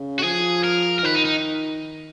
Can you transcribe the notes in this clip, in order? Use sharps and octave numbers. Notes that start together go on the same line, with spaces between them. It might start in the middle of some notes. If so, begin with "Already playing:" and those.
Already playing: C#3
F#4
F3 G#4
A#4
A#4
D#3 B4
D#4
D#4